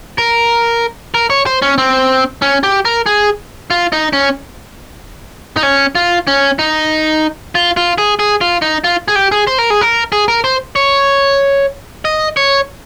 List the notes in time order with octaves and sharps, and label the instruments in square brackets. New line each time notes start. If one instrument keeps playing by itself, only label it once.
[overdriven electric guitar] A#4
A#4
C#5
C5
C#4
C4
C#4
G4
A#4
G#4
F4
D#4
C#4
D#4
C#4
F4
C#4
D#4
F4
F4
G#4
G#4
F4
D#4
F4
G#4
G4
G#4
C5
A#4
G#4
A#4
G#4
A#4
C5
C#5
D#5
C#5